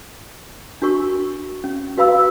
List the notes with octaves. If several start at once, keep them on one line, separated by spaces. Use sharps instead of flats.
D4 F#4 A#4 C#6
C#4
F#4 B4 F5 B5 E6